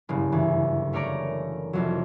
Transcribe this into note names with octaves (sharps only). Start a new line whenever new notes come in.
F#1 G2 C#3
D2 E3
A3 A#4 C#5 D5 A#5 D7
C2 F2 F#3